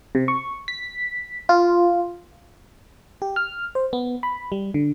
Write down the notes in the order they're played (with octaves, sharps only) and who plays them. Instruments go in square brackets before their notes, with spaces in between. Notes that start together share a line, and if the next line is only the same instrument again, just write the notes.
[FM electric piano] C3
C#6
B6
F4
G4
F6
C5
B3
B5
G3
D3